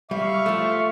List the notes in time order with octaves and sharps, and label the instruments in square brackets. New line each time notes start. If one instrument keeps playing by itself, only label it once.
[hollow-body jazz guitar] G3 [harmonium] E5 [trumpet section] F5 C#6
[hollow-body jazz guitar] F3 A3